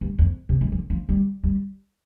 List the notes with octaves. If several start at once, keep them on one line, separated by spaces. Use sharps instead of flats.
G2
F2
C3
G3
F3
F3
G3
G3